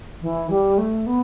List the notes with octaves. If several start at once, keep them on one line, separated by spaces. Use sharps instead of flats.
E3
G3
A3
B3